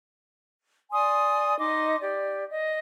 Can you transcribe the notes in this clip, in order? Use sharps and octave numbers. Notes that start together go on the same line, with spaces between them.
D5 G#5 C6 D#6
D#4 D#5 C6 D6
G4 D5
D#5